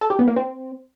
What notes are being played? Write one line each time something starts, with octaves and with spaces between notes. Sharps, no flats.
A4
G4
B3
A#3
C4